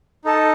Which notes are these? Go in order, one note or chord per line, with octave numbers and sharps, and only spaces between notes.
D#4 A4 D#5 A5